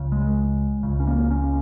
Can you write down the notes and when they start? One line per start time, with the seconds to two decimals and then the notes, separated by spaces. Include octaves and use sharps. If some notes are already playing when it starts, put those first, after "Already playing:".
Already playing: C#2 C#3
0.12 G#3
0.83 C#2 C#3
1.00 C#4
1.07 A#3
1.31 C#4